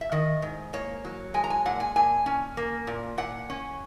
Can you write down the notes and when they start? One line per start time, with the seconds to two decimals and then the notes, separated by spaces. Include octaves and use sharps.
0.01 E5
0.12 D#3 D#5
0.42 G#2
0.73 A#3 C#5
1.05 F#3
1.34 G#3 G#5
1.44 A#5
1.50 G#5
1.66 A#2 F#5
1.80 G#5
1.96 A#2 G#5
2.26 C#4
2.57 A#3
2.87 A#2
3.18 A#2 F#5
3.50 C#4